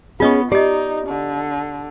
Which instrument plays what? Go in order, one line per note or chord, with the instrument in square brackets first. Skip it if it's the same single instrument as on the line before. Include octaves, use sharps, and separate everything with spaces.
[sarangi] B3 [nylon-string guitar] C#4 G#4 [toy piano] F4 D#5 C#6
[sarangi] D#4 [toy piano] G4 D#5 [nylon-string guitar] D5
[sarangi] D3